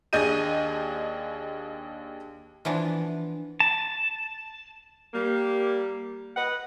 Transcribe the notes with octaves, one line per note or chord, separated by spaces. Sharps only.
D#2 D4 G#4 D#5 G6 D#7
E3 F3 B3 D4
A5
G3 A#3
B4 D#5 F#5